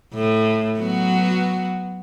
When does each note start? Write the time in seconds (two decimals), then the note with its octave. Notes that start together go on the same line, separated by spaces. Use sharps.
0.14 A2
0.80 F#3 B3 F#4